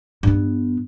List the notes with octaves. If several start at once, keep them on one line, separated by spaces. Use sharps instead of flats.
G2 B3